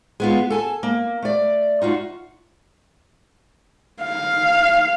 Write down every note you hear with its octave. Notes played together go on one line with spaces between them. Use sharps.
G#3 B3 F4
A4 G#5 A5
A#3
A3 D5
D#4 F4 F#4
F5